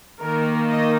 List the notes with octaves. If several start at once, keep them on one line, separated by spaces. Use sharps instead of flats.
D#3 A#3 D#4 A#4
D#5